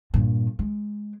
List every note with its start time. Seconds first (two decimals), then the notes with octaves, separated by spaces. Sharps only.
0.14 G2 A#2
0.59 G#3